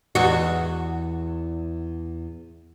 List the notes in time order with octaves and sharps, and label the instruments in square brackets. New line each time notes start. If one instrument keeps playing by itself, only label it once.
[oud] E2 F#4